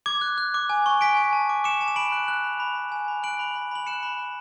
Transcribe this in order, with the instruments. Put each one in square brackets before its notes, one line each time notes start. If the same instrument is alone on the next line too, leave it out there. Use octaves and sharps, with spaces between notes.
[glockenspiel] D6 G#6
F#6
F#6
D6
G#5
C#6
G#5 B6 D7
G#5
A5
D6
D6 C#7 E7
A5
E7
B5 D7 F#7
F#6
F#6
B5
B5
B5
G#5
B5
F#6 D7 F#7
B5
B5
B5 F#7
F#6 C#7 E7
B5
B5